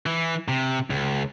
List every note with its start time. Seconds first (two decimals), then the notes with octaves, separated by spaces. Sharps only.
0.06 E3
0.48 C3
0.90 C#2